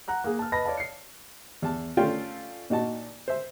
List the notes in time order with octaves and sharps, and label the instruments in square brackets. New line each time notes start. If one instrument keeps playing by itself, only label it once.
[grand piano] F#5 A#5 F#6
A#3 G#4
A5 F6
B4 D#5 A5 B5 A#6
C#5 D5 F5 A5
C7 C#7
[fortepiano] E2 A5
A3 C#4 F4 A4 D5 G5
A#2 D#4 F#4 A5
C5 E5